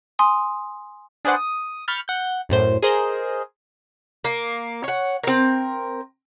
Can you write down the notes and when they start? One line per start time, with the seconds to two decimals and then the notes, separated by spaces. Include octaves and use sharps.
0.19 G#5 C6 D#6
1.25 D4 G#4 B4 C5 D5 F#5
1.36 D#6
1.88 B5 C#6 F6 G6 A6
2.08 F#5 G6
2.49 F#2 A2 C5
2.83 G#4 A#4 C5 D#5
4.24 A#3
4.84 C#5 F#5
5.23 C4 A#4